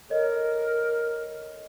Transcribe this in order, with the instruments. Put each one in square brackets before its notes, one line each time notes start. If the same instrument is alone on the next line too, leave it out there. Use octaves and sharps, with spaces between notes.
[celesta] A4 C#5 D#5 [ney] A#4